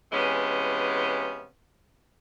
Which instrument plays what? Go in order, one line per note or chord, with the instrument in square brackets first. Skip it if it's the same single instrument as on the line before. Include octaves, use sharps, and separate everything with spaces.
[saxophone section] C3 E3 G#3 B3 C#4